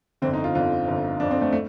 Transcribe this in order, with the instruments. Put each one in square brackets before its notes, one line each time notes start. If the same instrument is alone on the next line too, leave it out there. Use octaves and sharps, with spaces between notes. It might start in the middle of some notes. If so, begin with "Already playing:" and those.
[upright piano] G1 F2 D3 C4
D#4
F4
G1 F2 D3 F4
G1 F2 D3
G1 F2 D3 D4
C4
A3
A3